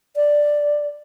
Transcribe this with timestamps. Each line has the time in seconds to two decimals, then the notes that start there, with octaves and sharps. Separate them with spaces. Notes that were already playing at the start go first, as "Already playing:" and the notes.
0.16 D5